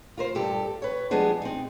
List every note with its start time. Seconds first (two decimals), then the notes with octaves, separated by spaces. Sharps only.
0.17 F4 A#4 C5
0.35 G2 G4 A4
0.82 B4 C#5
1.11 F3 G3 G#3 B3 D4 G#4
1.42 C4 D#4